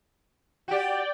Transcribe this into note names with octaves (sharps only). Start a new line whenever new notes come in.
F#4 G4 D5 G5